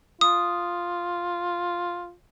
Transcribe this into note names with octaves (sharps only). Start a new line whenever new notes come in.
F4 D#6